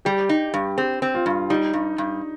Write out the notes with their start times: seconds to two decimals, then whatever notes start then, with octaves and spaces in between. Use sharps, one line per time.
0.05 G3 G4
0.29 D#4
0.54 G2
0.78 C4 G4
1.02 C4
1.14 F4
1.26 G2
1.50 G3 D#4
1.73 G2
1.98 G2